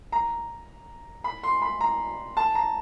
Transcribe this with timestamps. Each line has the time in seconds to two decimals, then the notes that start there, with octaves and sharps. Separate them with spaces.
0.12 A#5
1.24 B5
1.43 C6
1.62 B5
1.81 A#5
2.37 A5
2.55 A#5